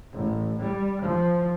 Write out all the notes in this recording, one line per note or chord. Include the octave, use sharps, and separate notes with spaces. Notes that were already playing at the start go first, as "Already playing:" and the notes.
A1
G3
F3